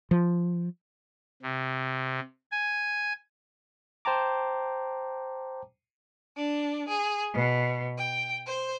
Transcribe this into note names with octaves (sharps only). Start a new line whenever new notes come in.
F3
C3
G#5
C5 G5 A5 A#5 D6
D4
G#4
B2
G5
C5